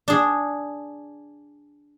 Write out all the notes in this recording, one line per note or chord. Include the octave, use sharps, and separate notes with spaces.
D4 G#4